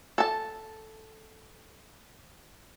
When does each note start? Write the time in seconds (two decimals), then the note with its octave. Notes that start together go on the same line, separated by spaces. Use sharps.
0.18 A4 A5